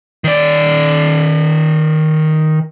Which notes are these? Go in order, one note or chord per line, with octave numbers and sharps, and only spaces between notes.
D#3 D5